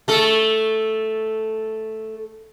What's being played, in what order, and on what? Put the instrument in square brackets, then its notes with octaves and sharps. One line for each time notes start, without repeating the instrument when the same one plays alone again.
[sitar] A3 A4